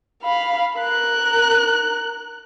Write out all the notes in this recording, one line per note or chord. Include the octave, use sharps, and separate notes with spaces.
F5 B5
A#4 F#6